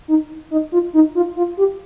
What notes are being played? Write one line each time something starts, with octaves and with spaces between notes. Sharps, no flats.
D#4
D#4
F4
D#4
F4
F4
G4